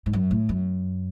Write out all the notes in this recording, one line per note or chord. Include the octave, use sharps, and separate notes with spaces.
G#2
F#2
A2
F#2